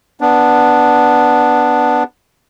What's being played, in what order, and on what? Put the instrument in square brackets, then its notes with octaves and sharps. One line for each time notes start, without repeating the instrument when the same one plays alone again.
[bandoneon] B3 D4